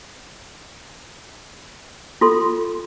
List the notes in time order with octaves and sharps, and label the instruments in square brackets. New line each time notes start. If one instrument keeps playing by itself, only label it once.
[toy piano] F4 A4 C6